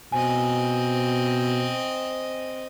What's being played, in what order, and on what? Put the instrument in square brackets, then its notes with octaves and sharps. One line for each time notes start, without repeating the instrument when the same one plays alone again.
[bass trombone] B2 [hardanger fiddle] C4 D#5 [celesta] G#5